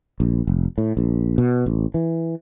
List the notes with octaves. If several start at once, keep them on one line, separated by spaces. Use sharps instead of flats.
A#1
F1
A2
A#1
B2
A1
E3